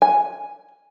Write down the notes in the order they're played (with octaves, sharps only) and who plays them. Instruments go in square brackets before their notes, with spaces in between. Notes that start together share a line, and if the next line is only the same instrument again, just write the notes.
[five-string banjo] G#5